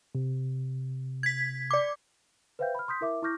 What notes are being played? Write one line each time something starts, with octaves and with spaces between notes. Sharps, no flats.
C3
G#6 B6
D5 D6
B4 C5 E5 F5 G5 G6
B5 F6
C6 D#6 G6 B6
E4 A#4 E5 D6
E4 C#6 D6 F6 G6 A#6